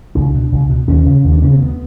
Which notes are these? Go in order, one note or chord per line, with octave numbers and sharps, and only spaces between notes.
C#2 D4
B2
C#2
B2
D#2 C#4
C#3
D#2
D4
C#3 C#4
C4
D2 B3